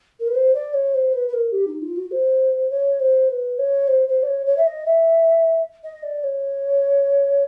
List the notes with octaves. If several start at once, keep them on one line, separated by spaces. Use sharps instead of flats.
A#4
B4
C5
D5
C#5
C5
B4
B4
A#4
G4
D#4
F4
F#4
C5
C#5
C5
B4
C#5
C5
C5
D5
C#5
C#5
E5
D#5
E5
D#5
D5
C#5